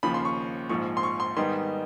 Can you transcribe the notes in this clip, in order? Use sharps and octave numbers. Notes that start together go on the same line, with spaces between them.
D#2 C#3 F3 B5
C6
C#6
A#1 G#2 F3 C#6
C6
C#6
C6
G#2 D#3 G3 B3 D#4 C6